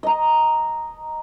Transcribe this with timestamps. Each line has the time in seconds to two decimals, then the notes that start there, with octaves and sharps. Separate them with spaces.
0.03 D#5 A#5